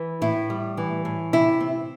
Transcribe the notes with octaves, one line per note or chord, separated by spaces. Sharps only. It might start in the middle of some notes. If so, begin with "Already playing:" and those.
Already playing: E3
A2 E4
G3
E3
A2
C3 E4
C4